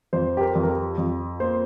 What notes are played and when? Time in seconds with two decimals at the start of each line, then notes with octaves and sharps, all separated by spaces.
0.13 F2 C5
0.37 G4
0.41 A#4
0.55 F2
0.63 A#4
0.70 G4
0.98 F2
1.40 A#3 C5